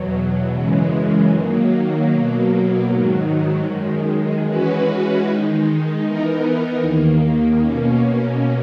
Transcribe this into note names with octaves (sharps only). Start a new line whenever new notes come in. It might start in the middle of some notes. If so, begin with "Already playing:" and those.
Already playing: E2 B2 F#3
F#2 C#3 E3 G#3
D#3 F#3 A#3
B2 F#3 A#3
G#2 D#3 F#3
F#2 D#3 G#3
E3 G#3 C#4 F#4 B4
D#3 G#3 D#4
E3 B3 D#4 A#4
D#2 D#3 A#3
B2 A#3 C#4